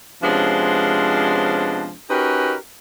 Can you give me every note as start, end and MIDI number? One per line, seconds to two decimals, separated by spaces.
0.23 1.94 48
0.23 1.94 53
0.23 1.94 56
0.23 1.94 59
0.23 1.94 61
0.23 1.94 62
2.09 2.54 61
2.09 2.54 63
2.09 2.54 66
2.09 2.54 67
2.09 2.54 70
2.09 2.54 71